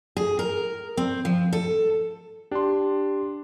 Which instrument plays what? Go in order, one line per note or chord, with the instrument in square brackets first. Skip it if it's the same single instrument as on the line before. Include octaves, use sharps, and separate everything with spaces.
[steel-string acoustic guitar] G#4
A#4
C4
F3
A4
[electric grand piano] D4 C6 [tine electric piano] G4